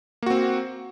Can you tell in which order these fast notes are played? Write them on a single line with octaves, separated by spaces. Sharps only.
A#3 F#4 C4